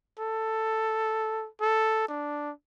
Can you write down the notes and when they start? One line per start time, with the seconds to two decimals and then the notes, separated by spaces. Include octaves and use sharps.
0.19 A4
1.61 A4
2.08 D4